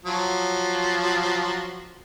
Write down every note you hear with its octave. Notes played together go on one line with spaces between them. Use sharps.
F3 F#3